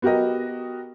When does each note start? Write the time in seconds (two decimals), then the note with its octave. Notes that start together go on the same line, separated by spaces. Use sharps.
0.02 B3 F#4 G4 A#4 D#5